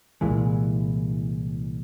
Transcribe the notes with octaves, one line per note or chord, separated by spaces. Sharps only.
C2 A#2 E3 G#3